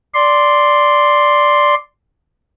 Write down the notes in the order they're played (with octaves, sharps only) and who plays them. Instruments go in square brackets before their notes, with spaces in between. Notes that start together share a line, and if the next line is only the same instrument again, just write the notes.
[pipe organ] D5 C6